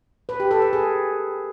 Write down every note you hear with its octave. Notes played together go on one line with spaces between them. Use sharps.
B4
G4
A4
B4
G#4